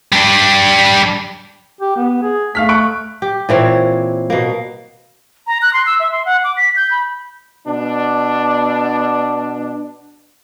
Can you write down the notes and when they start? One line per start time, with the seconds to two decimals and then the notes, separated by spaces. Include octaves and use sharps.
0.13 G3 D4
1.81 G4
1.96 B3
2.22 G#4
2.55 A3 F5 F6 B6
2.69 C#6 F#6 D7
3.22 G4
3.49 A#2 E3 C4 C#5
4.30 B2 A#3
5.47 A#5
5.62 F#6
5.73 C6
5.86 E6
6.00 E5
6.12 C6
6.25 F#5
6.44 D6
6.57 B6
6.76 G6
6.91 B5
7.67 B2 D4